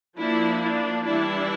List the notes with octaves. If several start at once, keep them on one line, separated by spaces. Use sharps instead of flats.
F3 A#3 D4 E4
D4
E3 G3 D4 E4